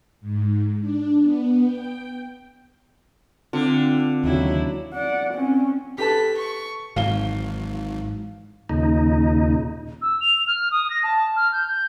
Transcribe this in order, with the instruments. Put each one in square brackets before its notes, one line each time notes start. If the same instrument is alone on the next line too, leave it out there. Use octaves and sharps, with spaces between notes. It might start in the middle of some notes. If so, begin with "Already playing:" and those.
[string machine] G#2
D4
B3
G5
[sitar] D3 [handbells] C4 F4
[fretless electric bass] D#2 C#3 [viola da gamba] F#3 E4
[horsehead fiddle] D5 F#5
C4 C#4
[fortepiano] G4 B4 A5 [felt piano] A4 [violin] B6
[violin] C#6
[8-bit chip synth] G#1 [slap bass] G#2 E3 F#3 [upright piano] F5 G7
[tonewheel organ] D#2 A#2 C#3 D#4
[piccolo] E6
F7
F6
D#6
A#6
A5
F6
G6
G6